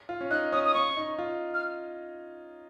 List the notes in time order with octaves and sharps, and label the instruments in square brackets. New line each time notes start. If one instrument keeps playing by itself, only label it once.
[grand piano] F4
C#4
[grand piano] D#4 [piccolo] F#6
[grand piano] C#4 [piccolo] D#6
[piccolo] D#6
[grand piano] C#4 [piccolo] C#6
[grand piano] D#4
F4
[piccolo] F6